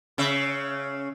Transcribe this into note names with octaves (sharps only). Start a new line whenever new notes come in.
C#3 E5